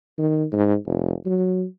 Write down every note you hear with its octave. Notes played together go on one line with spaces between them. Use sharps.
D#3
G#2
F1
F#3